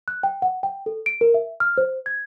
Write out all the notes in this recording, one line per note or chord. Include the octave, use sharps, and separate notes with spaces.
F#6
G5
F#5
G5
A4
D7
A#4
E5
F6
C5
G#6